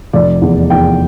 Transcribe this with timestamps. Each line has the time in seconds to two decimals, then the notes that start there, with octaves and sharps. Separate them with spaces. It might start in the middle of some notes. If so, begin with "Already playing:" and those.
0.13 F1 D5
0.42 E2
0.70 E2 G5